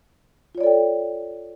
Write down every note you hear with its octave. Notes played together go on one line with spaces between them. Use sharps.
F4 A4 C#5 D5 G5